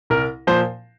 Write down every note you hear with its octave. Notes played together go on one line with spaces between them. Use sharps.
C2 A#4
A#2 F3 C5